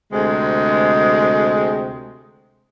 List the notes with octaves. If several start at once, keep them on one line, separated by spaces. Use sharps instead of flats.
D2 C3 G#3